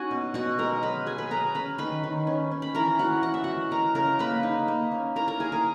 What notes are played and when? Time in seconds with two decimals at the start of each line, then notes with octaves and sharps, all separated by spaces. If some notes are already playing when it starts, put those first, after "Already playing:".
Already playing: C#4 D#4 F#4 F#5 G#5
0.11 B2
0.34 B2 F#4 F#5
0.58 G#3 A#4 A#5
0.83 F#3 B4 B5
1.06 F#3 G#4 G#5
1.18 B4 B5
1.30 F#3 A#4 A#5
1.55 C#4 B4 B5
1.78 D#3 B4 B5
2.04 D#3
2.27 C#4
2.51 C#4
2.62 B5
2.75 E3 A#4 A#5
2.99 E3 F#4 F#5
3.23 E3 F#5
3.34 E5
3.44 G#3 F#4 F#5
3.71 G#3 A#4 A#5
3.95 C#3 A#4 A#5
4.19 A#3 B4 B5
4.43 D#4
4.68 A#3
4.91 C#4
5.16 E4 A#4 A#5
5.28 A#4 A#5
5.40 E4 G#4 G#5
5.52 A#4 A#5